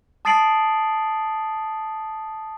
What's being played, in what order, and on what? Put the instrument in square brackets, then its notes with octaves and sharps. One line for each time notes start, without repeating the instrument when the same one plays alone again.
[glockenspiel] A5 D#6 A6 C7 D7 F#7